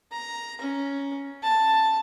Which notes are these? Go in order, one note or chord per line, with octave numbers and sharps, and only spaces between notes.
A#5
C#4
A5